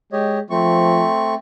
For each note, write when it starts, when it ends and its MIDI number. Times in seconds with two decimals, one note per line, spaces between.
0.12 0.42 56
0.12 0.39 67
0.12 0.39 73
0.12 0.39 75
0.50 1.07 53
0.50 1.35 57
0.50 1.35 60
0.50 1.35 85